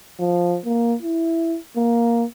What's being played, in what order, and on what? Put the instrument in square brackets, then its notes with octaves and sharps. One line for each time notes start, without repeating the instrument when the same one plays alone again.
[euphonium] F3
A#3
E4
A#3